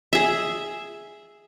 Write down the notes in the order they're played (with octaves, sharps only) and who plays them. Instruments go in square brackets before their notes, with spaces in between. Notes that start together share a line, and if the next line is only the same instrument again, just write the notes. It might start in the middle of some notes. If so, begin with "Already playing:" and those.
[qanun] G#4 E5